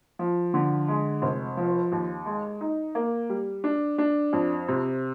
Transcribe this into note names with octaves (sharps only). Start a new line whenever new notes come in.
F3
D3
G#3
F1
F3
D#2
G#3
D#4
A#3
G3
D4
D4
F2
C3